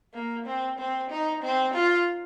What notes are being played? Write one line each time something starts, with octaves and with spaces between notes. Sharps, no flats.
A#3
C4
C4
D#4
C4
F4